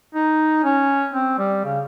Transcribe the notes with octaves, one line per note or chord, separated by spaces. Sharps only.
D#4
C#4
C4
G3
C#3